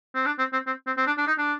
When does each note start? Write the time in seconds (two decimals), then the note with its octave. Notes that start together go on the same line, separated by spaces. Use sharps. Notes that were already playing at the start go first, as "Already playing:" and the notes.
0.15 C4
0.26 D4
0.39 C4
0.53 C4
0.67 C4
0.87 C4
0.97 C4
1.07 D4
1.18 D4
1.27 D#4
1.38 D4